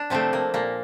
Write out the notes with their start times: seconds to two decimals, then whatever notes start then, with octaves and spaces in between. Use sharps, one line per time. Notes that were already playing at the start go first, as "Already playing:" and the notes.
Already playing: D4
0.10 C3 F3 A3 C4
0.33 A#3
0.54 A#2 A#3